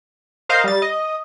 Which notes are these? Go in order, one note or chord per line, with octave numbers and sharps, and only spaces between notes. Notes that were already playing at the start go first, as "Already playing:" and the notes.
A#4 C5 D#5 F5
G3 A6
D#5